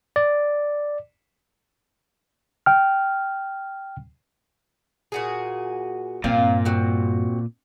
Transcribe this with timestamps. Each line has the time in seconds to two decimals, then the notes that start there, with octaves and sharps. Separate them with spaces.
0.16 D5
2.66 G5 F6
5.12 A#2 F#4 G#4
6.24 G2 A#2 C4 F4 F5
6.65 C4 F#4